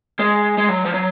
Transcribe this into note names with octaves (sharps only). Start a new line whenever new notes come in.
G#3
G#3
F#3
F3
F#3